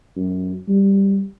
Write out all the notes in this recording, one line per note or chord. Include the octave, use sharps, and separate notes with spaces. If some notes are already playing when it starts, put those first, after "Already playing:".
F#2
G3